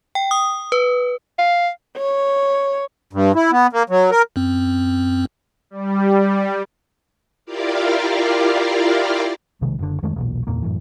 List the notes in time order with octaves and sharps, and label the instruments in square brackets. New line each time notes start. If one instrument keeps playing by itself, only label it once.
[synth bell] G5
D#6
B4
[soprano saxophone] F5
[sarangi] C#5
[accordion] G2
E4
B3
A#3
F#3
A#4
[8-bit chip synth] F#2 C4
[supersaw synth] G3
[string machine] E4 F4 G4 A#4 D5 F5
[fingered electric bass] B1 C3 D#3 G#3
F#1 D3
F2 D#3 G#3 A3
E1 B1 A#2
F#1 E2 A#2 A#3
F#2 A2 E3